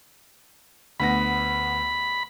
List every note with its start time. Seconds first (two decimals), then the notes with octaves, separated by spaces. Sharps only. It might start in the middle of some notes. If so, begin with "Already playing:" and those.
1.00 D2 B3 B5 A#6